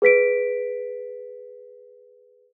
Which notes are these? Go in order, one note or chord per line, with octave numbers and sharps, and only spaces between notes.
G#4 B4 B6 D7